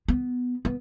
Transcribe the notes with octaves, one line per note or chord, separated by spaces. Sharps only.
B3
B3